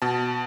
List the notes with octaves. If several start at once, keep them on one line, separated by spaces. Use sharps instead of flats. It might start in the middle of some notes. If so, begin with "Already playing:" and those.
B2 A5